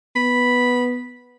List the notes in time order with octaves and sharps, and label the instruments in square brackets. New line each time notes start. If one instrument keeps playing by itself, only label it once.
[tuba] B3 [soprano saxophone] B5